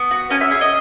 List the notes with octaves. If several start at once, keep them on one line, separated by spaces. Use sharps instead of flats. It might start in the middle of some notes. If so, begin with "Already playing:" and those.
Already playing: B3
F#4
C#4 G#5
E5
G#4 E5
D#5